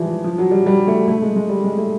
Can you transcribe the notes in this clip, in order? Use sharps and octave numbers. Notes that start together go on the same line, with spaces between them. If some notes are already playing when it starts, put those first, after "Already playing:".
Already playing: E3 F3 G3 G#3
F3
F#3
G3
G3
A3
A3
G#3
G#3
G3
G#3
A3